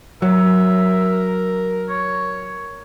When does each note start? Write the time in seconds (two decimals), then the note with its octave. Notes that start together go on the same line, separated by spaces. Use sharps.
0.22 F#3 A#4 E5
1.89 C#5